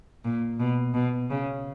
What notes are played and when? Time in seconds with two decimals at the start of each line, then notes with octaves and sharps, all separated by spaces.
0.25 A#2
0.60 B2
0.94 B2
1.30 C#3